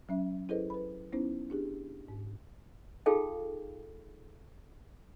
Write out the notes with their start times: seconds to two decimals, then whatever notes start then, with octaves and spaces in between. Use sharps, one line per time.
0.09 F#3 C#4 E5
0.49 E4 G#4 A4 B4 C5 D#5
0.70 B4 B5
1.12 B3 C#4 D#4 E4 C5
1.50 D4 G4 G#4
2.08 G#2
3.06 D#4 F4 G#4 A4 F5 G5